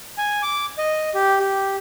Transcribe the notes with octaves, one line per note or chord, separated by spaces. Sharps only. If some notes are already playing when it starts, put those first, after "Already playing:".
G#5
D6
D#5
G4
G4